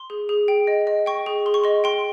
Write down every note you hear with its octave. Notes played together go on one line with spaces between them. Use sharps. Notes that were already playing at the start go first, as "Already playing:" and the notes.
Already playing: C6
G#4
G#4
G5
D#5
D#5
G5 C#6
G#4
G#4 C6
C#6
D#5 C6
G5 C6